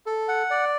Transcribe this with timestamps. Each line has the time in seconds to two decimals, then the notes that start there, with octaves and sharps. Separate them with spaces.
0.06 A4
0.28 F#5
0.50 D5